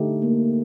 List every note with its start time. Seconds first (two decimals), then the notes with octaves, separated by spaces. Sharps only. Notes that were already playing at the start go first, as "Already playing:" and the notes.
Already playing: D3 A3 D#4 G4
0.23 A#3